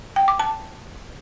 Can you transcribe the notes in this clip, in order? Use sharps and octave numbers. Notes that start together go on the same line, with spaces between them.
G5
D6
A5